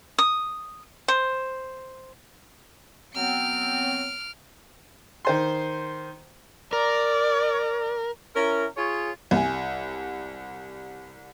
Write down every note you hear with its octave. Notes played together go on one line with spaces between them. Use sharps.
D#6
C5
F#3 B3 C4 F6 D7
D#3 C5 C6
A#4 D5
C#4 E4 A#4
F4 G#4 C#5
C2 G#5